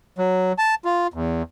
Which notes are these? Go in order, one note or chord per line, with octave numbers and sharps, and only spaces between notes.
F#3
A5
F4
E2